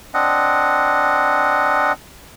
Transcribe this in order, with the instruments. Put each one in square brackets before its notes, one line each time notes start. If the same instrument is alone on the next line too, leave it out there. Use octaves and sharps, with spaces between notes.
[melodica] C4 D4 D#5 F#5